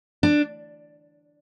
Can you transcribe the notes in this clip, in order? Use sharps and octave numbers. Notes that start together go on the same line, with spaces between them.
D4